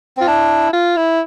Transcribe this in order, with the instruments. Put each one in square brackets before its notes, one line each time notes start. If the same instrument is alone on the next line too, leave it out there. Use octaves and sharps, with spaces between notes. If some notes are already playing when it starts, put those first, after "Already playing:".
[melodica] C4 [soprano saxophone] F4
[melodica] D4 [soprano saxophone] E4
[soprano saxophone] F4
E4